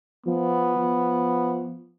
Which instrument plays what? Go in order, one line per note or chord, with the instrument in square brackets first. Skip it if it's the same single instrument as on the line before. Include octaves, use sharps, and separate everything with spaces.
[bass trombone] F3 [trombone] B3
[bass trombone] F3